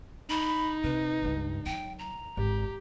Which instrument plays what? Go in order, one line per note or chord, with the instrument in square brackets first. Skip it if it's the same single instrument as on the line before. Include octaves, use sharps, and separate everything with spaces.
[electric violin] D#4 [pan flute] B5
[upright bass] C3 [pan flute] B4
[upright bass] C#2 G2
[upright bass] F#3 G3 [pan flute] G5
[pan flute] A#5
[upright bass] G#1 [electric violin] G4